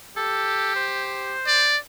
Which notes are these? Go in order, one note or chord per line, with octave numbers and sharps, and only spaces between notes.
G4 A4
C5
D5